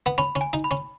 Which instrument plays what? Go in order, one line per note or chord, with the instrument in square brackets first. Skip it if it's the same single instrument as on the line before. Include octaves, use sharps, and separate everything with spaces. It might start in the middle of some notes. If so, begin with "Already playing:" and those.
[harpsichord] B3
[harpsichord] C#4 [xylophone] B5
[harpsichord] C#4
[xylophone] G#5
[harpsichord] D#4
[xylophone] B5
[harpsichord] C#4